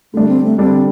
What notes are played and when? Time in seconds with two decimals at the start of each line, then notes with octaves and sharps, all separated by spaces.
0.14 D3 G3 A3 D4
0.28 C4
0.44 A3
0.58 D3 G3 C4 D4